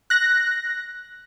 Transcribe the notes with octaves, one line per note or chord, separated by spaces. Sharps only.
F#6 A#6